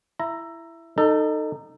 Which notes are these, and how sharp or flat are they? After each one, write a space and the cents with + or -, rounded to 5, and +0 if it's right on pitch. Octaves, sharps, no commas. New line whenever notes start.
E4 +15 A#5 +0
D#4 -15 A4 +20